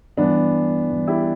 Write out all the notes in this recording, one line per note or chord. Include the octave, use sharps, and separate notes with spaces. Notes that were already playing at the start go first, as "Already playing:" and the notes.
G2 E3 B3 D4
G2 E3
E4 G4